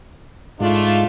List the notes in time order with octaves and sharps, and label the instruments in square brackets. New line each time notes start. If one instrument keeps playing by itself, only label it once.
[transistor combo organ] G#2 [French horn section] A3 D4 F4